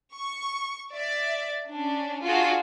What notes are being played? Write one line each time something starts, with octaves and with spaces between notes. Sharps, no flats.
C#6
D5 E5
C#4 D4
D4 F4 F#4 G#4